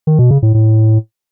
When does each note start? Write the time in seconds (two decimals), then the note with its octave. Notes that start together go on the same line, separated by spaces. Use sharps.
0.07 D#3
0.19 B2
0.31 C#3
0.42 A2
0.54 A2